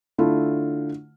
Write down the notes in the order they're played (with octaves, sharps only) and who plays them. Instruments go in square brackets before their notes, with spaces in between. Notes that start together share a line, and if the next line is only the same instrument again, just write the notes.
[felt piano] D3 A3 E4 F4